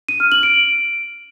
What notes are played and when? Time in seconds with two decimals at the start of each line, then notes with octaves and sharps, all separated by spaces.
0.09 D#7
0.20 F6
0.32 F#7
0.43 D7